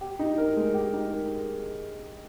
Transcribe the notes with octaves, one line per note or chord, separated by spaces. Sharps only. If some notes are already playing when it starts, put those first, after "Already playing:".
G4
D#4
A#4
G#3
G4
D#4
A#4